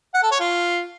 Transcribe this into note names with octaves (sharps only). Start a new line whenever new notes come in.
F#5
A4
C#5
F4